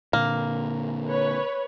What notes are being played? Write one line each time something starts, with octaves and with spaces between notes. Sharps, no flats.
A#2 D3 A#3
B4 C#5